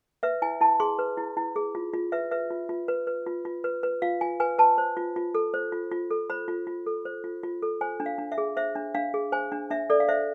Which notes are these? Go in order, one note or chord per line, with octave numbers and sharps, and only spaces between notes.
B4 E5
E4 G#5
E4 A5
G#4 C6
B4
E4
E4
G#4
F4
F4
B4 E5
B4 E5
F4
F4
B4
B4
F4
F4
B4
B4
F4 F5
F4 G#5
B4 G#5
B4 A5
C5
F4
F4
A4
C5
F4
F4
A4
C5 B5
F4
F4
A4
C5
F4
F4
A4
C5 G#5
D4
F5
D4
E5
G#4
C5 E5
D4
D4 F5
G#4
C5 G#5
D4
D4 E5
A4 D5
F5
C5 E5